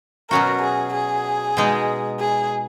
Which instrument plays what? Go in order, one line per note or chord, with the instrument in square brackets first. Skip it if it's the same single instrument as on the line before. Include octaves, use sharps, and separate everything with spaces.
[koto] B2 F#3 C#4 F#4 [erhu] A#4
[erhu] G#4
G#4
[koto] B2 G#3 D#4
[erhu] G#4